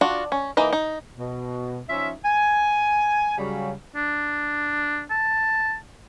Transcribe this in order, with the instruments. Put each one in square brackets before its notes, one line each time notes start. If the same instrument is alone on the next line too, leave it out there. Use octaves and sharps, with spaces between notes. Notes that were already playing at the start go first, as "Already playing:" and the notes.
[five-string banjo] D4 F4 F#4
C#4
E3 A#3 D#4 D#5
D#4
[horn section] B2
F3 C#4 D#4 F4 E5
G#5
C#3 F#3 G3
[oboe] D4
A5